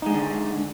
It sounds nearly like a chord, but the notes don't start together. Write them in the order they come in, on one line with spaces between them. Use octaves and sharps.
D#4 G#3 D4 D3